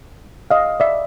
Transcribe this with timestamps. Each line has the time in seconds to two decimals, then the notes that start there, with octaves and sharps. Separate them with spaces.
0.51 D#5 F5
0.80 D5 E5